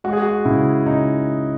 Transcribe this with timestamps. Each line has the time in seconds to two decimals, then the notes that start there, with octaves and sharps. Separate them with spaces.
0.04 G#3 F#4
0.13 G#4
0.22 F#4
0.45 C#3 E4
0.86 C#3 D#4